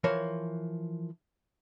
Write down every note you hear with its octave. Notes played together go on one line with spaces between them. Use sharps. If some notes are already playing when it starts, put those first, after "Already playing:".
E3 F3 A#4 C#5 A5